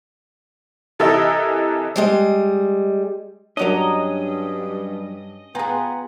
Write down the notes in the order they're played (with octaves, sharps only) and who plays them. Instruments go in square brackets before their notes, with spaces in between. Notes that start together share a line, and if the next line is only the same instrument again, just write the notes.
[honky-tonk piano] C3 E3 A4 A#4 D#5 E5
[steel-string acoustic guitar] G3 G#3 D#5
[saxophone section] G2 [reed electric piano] F#3 D4 [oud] C#4 F#4 A#4 [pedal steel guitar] D#5
[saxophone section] B3 [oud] F4 G#4 [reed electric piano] G5 G#5 A#5